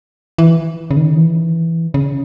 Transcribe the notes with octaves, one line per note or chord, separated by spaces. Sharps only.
E3
C#3
D#3
E3
C#3